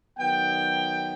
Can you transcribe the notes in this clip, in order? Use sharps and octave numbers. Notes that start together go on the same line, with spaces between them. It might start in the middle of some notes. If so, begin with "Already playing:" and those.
D#3 F#3 B3 G5